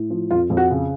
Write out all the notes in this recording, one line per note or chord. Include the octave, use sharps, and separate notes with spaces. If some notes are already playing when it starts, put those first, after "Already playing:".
Already playing: A2
F3
F2 F4
F2
F#4
C#3